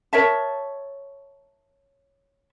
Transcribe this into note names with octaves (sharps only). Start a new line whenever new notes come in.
A#4 C#5 E5 A5